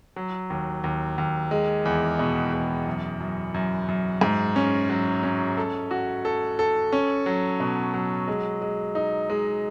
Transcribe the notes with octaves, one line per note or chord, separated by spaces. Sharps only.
F#3
D#2
D#2
D#2
G#3
E2
B2
E2
F#2
F#2
F#2
F#2
G#2
C#4
F#3
C#4
A4
F#4
A4
A4
C#4
F#3
B2
F#3
G#3
G#3
D#4
G#3